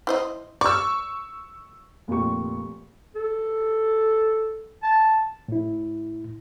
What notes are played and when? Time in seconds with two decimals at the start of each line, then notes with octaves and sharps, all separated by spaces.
0.07 E4 C5 D#5
0.61 D5 C#6 E6
2.08 F1 A#2 F4 G4 C#6
3.16 A4
4.83 A5
5.48 A2 E4